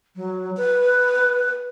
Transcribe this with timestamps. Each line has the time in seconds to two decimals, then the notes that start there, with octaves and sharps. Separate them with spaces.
0.16 F#3
0.57 B4